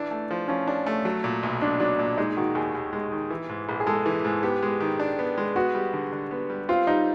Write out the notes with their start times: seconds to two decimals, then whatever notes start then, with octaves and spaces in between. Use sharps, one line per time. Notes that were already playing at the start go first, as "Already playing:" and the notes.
Already playing: E3 D4
0.11 A3
0.31 F3
0.48 F3 C#4
0.67 D4
0.86 A3
1.05 F#3
1.24 A#2
1.43 B1
1.61 B1 D4
1.80 F#3 D4
1.99 A#2
2.17 G#3 D#4
2.37 D#3 F#4
2.55 D#2 G#4
2.75 D#2
2.93 G#3
3.12 D#3
3.31 E3
3.49 G#2
3.69 A#1
3.80 G#4
3.86 G#3 A4
4.06 E3
4.25 G#2
4.43 B3 G4
4.63 G#3
4.80 D#3
5.00 D4
5.19 B3
5.38 G#3
5.56 B3 F#4
5.75 G3
5.93 D3
6.12 D3
6.31 B3
6.50 G3
6.69 C4 F4
6.87 G3 D#4